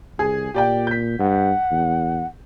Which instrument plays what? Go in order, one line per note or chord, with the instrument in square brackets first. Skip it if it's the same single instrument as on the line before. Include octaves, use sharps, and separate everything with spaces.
[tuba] C2 [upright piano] G#4
[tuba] A#2 [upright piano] G4 D5 G5
[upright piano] G6 B6
[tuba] G2 [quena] F#5
[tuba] E2